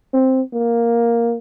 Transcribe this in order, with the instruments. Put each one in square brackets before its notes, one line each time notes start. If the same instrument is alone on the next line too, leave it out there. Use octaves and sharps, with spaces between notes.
[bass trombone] C4
A#3